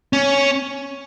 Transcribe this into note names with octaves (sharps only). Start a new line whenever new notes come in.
C#4